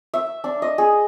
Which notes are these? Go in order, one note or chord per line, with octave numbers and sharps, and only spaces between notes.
E5
D4
D#5
G#4